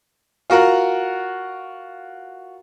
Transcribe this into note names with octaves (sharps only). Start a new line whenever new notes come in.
F4 F#4 A#4 F#5